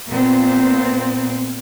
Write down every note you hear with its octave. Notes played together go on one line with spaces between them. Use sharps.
A#2 B3 C4